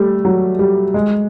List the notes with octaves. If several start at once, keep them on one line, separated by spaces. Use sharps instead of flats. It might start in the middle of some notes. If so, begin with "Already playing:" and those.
Already playing: G3 A3
F#3
G3
G#3